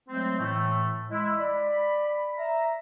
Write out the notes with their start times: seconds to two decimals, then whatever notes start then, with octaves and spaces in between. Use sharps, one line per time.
0.09 F#3 G#3 A3 C4
0.39 A2 E3 A3
1.10 G#3 E4
1.38 D5 B5
2.38 E5 A#5